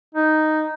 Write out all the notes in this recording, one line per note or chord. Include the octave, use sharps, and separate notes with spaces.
D#4